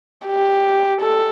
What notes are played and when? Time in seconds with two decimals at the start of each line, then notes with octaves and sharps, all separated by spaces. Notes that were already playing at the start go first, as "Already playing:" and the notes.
0.26 G4
1.01 A4